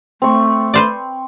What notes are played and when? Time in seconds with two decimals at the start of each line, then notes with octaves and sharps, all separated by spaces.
0.22 A3 C4 C#6
0.74 B4 C5 D5